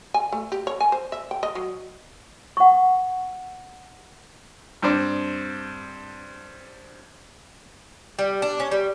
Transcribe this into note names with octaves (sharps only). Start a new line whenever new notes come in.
G#5
A3
G4
C#5
G#5
C5
E5
G5
D#5
F#3
F#5 C#6
G2 C4 D4
G3
D4
C#4
G3